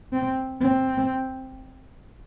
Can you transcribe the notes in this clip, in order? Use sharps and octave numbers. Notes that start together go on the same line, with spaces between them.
C4
C4